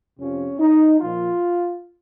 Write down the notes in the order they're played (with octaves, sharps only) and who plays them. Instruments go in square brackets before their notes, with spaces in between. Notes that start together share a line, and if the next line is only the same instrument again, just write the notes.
[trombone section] F2 C3 F3 C#4
D#4
A#2 F3 F4